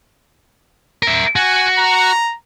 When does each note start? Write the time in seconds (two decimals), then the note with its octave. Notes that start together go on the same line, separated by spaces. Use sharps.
1.03 A#4 E5
1.36 F#4 G#5
1.79 A#5